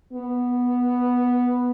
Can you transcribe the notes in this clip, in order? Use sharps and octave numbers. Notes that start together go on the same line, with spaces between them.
B3